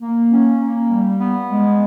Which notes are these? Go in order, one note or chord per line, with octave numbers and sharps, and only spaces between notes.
A#3
C#4
A#3
G3
B3
G#3